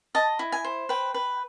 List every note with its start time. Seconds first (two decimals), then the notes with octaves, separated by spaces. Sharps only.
0.15 D#5 A5
0.39 E4
0.52 G#5
0.64 C5
0.89 B4 G5
1.14 B4